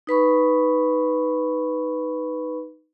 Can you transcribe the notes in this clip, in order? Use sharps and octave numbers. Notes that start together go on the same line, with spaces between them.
D#4 B4 B5 C#6